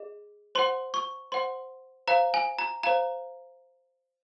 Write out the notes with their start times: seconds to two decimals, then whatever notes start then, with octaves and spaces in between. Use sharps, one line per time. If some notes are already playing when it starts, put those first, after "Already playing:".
Already playing: G#4 D#5
0.55 C5 F#5 C6
0.94 C#6
1.32 C5 F#5 C6
2.07 C5 F5 A#5
2.34 G#5
2.59 A#5
2.83 C5 F5 A#5